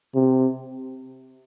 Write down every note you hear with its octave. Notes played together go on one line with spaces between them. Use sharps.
C3